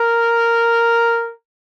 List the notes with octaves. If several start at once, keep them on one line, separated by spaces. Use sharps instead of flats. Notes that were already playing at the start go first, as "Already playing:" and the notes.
Already playing: A#4